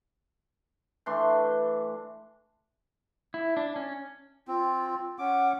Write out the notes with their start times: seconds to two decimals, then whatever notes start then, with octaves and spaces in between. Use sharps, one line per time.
1.06 E3 A3 D4 C6
3.34 E4
3.57 D4
3.76 C#4
4.48 C4 F4
5.19 C#4 F#5 D6